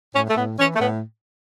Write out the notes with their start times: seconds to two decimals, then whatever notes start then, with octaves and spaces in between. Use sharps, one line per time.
0.15 A2 C#4
0.29 A3
0.37 A2 B3
0.59 E3 C#4
0.76 A3
0.80 A2 B3